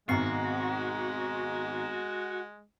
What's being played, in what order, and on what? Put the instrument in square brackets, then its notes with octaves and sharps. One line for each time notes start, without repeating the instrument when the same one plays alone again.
[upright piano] G#1 G#2 B2 [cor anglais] G#3 [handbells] B3 C4 C7 [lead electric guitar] F#4